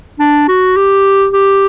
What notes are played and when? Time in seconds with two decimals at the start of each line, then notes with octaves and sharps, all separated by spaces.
0.20 D4
0.48 F#4
0.77 G4
1.33 G4